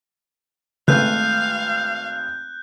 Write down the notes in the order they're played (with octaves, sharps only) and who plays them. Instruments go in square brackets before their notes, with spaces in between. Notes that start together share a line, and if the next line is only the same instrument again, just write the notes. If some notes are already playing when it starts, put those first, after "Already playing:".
[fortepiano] G#1 A3 B4 [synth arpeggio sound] C#3 [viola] F5 [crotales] F#6 G6